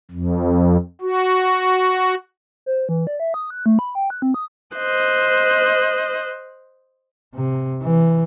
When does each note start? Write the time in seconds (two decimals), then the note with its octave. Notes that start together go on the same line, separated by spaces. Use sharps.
0.11 F2
1.01 F#4
2.66 C5
2.89 E3
3.07 D5
3.20 E5
3.34 D#6
3.50 F#6
3.66 A3
3.79 B5
3.95 G5
4.10 F#6
4.22 C4
4.34 D#6
4.77 C5 D#5 F#6
7.35 C3
7.82 E3